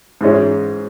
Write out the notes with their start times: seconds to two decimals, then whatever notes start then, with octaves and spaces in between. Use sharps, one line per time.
0.21 G#2 E3 G#3 C#4